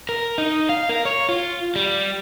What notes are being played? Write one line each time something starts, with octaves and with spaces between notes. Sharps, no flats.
A#4
D#4
F5
A#4
C#5
F4
G3